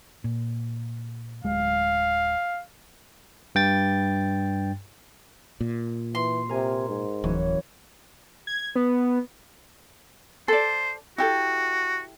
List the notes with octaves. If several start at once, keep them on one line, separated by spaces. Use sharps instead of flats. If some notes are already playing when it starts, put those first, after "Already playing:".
A#2
D1 G#3 F5
G2 G5 A6
A#2
E3 C6
C3 A#4 G#5
G#2
D1 E3 F#3 C#4
G#6
B3
A4 C5 D5
E4 F#4 G4 A4